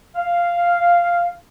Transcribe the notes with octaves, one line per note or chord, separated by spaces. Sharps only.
F5